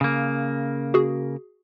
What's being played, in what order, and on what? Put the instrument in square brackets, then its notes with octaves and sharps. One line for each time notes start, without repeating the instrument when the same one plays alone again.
[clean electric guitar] C#3 A#3
[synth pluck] F#4 G#4